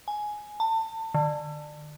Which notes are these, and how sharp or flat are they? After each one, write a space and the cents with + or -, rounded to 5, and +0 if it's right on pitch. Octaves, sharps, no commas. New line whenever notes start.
G#5 +10
A5 +30
D3 +25